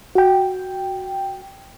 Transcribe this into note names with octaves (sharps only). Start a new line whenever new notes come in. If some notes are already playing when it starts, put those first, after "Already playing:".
F#4 G5